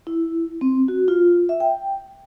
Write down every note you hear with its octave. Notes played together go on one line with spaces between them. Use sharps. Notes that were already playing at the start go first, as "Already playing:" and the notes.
E4
C4
F#4
F4
E5
G5